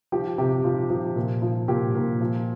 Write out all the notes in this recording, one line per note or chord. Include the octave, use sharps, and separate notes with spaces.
F3 G4
C3 G4
F3 F4
F3
A#2
F3
A#2 G4
A#2
F3